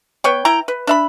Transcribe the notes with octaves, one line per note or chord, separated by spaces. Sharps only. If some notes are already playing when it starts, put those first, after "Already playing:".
B3 C#5 G5
E4 G5 A#5
B4
D4 E5 B5